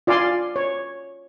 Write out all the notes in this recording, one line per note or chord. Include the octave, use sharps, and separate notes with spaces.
F4 D5 F5 G#5 C6
C#5